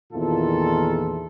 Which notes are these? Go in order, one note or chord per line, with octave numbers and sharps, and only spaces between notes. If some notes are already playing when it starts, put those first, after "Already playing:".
E2 A#2 D#3 E4 F4 A4